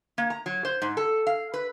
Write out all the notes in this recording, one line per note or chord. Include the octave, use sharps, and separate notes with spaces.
A#3
A#5
F#3
C5
G#2
A4
F5
B4